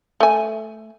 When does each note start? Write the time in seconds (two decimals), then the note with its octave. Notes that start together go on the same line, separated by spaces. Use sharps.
0.20 A3 G#5